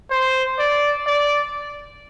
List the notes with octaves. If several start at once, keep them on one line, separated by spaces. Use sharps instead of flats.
C5
D5
D5